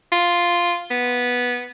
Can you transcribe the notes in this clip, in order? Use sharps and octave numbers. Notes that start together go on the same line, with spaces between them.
F4
B3